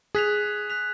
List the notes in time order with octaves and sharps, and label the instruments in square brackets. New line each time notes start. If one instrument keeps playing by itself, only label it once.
[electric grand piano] G#4 [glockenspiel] F#6 B6 F7
[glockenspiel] F#6 B6 F7